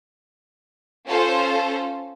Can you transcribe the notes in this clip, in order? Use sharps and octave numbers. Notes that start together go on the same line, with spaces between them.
C#4 F4 A4 C5